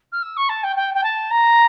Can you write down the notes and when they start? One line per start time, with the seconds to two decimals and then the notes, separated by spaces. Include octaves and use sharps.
0.12 F6
0.22 E6
0.37 C#6
0.49 A5
0.63 G5
0.76 G5
0.94 G5
1.03 A5
1.31 A#5